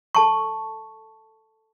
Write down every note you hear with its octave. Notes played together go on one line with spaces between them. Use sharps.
A4 A5 C#6